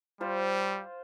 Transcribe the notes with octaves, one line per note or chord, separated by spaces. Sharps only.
G3 F4 C5